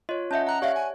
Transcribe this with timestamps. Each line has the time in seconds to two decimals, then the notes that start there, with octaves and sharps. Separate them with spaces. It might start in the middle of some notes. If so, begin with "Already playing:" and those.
0.09 F4 C#5 D#5
0.31 C#4 D#5 E5 F#5 A5 G6
0.47 F#5 A#5 F#6
0.62 G4 C#5 D5 E5 F5
0.75 G#5